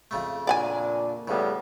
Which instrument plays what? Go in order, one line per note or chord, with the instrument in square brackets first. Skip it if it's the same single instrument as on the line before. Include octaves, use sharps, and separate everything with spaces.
[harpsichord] F2 C#3 A3
[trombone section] A#2 D4 [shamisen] D5 F#5 G#5
[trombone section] A2 G3 B3 [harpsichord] C#3